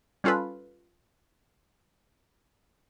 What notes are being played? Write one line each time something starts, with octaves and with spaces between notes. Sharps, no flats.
G3 C#4 F4 A4 B4